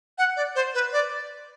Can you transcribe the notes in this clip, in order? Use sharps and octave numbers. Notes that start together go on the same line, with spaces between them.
F#5
D5
C5
B4
D5